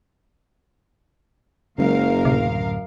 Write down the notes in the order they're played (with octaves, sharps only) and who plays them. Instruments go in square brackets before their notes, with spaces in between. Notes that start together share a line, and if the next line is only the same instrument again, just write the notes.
[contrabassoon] F#1 [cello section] F#2 A#4 F5 [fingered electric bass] C#3 G#3
[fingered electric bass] D2 A2 [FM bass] C3